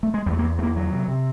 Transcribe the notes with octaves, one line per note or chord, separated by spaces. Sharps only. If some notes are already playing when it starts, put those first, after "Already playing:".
A3
G#3
E2 G3
A3
A#3
E2
E2 A3 A#3
D2 F#3
C3
C3